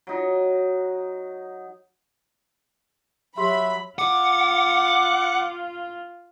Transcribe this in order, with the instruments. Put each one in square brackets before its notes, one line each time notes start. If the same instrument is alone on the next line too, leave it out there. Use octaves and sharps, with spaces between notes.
[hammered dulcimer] F#3 D#4
[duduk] F#3 [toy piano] G4 C6 [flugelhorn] E5 [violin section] B5
[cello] F4 [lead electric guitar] F#5 [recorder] D6